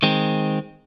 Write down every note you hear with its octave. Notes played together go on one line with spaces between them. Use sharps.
D#3 G#3 C4